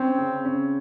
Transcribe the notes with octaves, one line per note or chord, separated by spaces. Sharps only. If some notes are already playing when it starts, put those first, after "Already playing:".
Already playing: C4 C#4
C#3
C#4